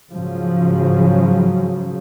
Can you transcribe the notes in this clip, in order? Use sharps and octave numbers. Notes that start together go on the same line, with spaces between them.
G#2 C#3 F3 F#3